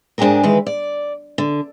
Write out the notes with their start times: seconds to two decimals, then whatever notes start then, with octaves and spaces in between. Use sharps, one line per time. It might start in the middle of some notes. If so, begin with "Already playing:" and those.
0.18 G#2 D4 E4 G4 G#4 A#4
0.43 D#3 E3 G#3 B4
0.66 D5
1.38 D3